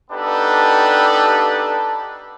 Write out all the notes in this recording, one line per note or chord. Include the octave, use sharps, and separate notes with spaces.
B3 D4 D#4 G4 A4 B4